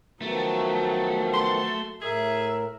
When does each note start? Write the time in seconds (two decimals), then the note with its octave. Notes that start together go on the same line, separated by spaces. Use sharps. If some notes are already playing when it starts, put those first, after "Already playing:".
0.22 D#3 F3 F#3 A3 B3
1.34 C6
2.02 A2 G#4 A#4 E5